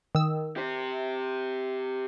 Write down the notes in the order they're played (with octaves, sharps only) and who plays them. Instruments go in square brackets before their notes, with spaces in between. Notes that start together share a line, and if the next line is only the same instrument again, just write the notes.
[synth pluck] D#3 E6
[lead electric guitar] G4 C5